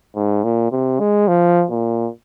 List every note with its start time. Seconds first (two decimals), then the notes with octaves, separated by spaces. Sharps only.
0.16 G#2
0.44 A#2
0.72 C3
1.00 G#3
1.28 F3
1.71 A#2